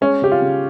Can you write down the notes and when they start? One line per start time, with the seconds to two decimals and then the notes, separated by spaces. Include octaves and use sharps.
0.01 G#3 C#4
0.22 C#3 G4
0.32 F4
0.42 C#3